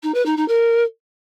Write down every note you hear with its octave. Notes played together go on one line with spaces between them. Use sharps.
D#4
B4
D#4
D#4
A#4